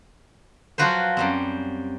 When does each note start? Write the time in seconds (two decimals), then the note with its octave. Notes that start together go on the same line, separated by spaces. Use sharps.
0.78 F3 F#3 F4 F#4 B4 C5
1.17 F#2 G3 C4